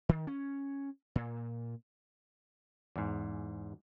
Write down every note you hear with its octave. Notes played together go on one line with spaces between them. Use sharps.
D#3
C#4
A#2
E2 G#2